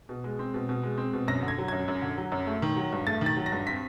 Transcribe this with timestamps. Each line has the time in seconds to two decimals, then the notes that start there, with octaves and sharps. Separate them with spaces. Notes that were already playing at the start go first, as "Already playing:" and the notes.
0.09 B2
0.24 G#3
0.39 C4
0.54 B2
0.69 B2
0.83 G#3
0.98 C4
1.13 B2
1.28 F#2 A#6
1.43 D3
1.48 G#6
1.58 F#3
1.68 F#2 G#6
1.88 F#2
2.02 D3
2.18 F#3
2.32 F#2
2.47 A3
2.62 D#3
2.77 F#3
2.92 G2
3.07 A3 A6
3.21 D#3 A6
3.37 F#3
3.46 A#6
3.52 G2
3.67 C4 B6